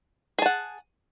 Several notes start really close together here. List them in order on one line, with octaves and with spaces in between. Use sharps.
G#4 A5 F#5